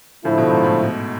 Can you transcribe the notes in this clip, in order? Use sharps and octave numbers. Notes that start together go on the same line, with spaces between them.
A2 D3 F3 A3 E4
B2
G#2
A2
B2